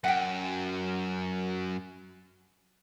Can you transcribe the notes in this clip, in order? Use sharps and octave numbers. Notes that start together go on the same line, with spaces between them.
F#2 F#5 G5